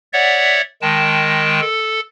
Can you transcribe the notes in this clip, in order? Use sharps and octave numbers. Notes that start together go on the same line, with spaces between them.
C#5 D5 E5 F#5
D#3 G#3 G5 A5
A4